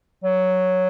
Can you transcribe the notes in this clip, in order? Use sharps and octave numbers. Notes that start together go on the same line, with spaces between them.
F#3